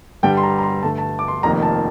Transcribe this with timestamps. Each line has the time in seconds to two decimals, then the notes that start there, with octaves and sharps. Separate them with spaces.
0.23 G2 D3 G3 G5
0.37 C6
0.43 A#5
0.58 A#5
0.63 C6
0.83 G2 D3 A3 A5
0.98 A5
1.19 D6
1.28 C6
1.43 F1 F2 D#3 A#3 A#5
1.63 A5